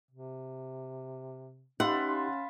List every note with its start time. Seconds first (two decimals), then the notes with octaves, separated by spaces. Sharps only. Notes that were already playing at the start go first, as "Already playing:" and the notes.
0.11 C3
1.80 C#4 D#4 F4 G4 B4 E5 F#5 C6